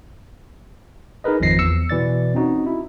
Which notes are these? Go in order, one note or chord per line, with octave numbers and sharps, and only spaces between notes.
D#4 G#4 A#4 B4 D#5
G#1 F2 D#3 F3 A#6 C7
E2 E6 C#7
B2 E3 D5 A6
C4 C#4 D#4 F#4
E4